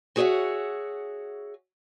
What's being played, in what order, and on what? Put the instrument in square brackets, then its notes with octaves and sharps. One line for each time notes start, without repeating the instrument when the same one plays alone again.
[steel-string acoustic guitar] F#4 G#4 C#5 D5 E5 F#5